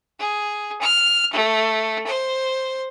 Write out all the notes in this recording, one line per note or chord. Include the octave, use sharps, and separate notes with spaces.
G#4
F6
A3
C5